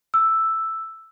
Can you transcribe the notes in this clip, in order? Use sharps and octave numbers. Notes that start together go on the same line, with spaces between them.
E6